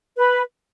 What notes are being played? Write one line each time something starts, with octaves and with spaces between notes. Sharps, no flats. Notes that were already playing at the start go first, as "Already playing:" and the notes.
B4